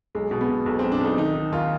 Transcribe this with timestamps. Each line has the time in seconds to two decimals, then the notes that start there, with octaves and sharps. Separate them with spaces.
0.15 B1 G#3
0.31 B2
0.41 B3
0.49 B2
0.66 B1
0.79 B1 C4
0.92 D4
1.00 B1 D#4
1.18 D#3 D#4
1.35 D#3
1.52 D#2 F4